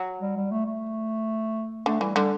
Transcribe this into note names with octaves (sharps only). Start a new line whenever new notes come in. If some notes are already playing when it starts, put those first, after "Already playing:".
Already playing: F#3
G3
G3
A3
A3
D3 A3
E3 G3
D3 G3